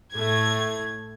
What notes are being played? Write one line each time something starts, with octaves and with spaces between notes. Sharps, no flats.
A2 A3 G#6